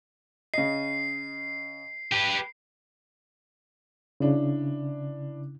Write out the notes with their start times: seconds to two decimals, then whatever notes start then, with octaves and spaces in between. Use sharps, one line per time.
0.54 C#3 D#5 C7
2.12 G4 B4
4.20 C#3 D4 E4